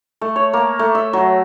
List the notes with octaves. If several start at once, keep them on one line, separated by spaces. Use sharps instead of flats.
A3
C#5
A#3
A3
E5
F#3